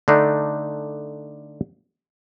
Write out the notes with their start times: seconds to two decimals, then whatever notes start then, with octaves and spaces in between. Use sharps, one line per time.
0.08 D3 A3 D4 D#4